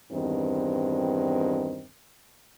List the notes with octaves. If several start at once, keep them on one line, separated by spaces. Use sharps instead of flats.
E2 G2 D#3 C4